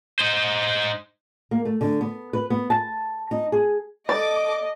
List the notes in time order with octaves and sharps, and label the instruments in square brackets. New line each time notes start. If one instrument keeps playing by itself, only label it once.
[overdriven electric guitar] D#4 C5
[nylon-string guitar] A#3
A3
D3
B3
B4
B3
A5
D#4
G#4
[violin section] A4 D6 [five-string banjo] D5 [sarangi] D#5